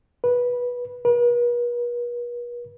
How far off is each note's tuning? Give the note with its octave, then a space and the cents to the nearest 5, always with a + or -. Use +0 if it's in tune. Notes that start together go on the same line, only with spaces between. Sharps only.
B4 -15
B4 -45